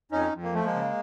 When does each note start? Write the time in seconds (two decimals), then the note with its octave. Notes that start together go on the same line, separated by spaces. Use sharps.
0.11 F2 C#4 D#4
0.33 F2
0.43 A#3
0.53 F3 A3
0.65 G#3 A#3
0.74 C#3